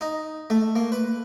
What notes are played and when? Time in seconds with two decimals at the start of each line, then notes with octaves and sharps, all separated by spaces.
0.01 D#4
0.50 A3
0.76 A#3
0.92 B4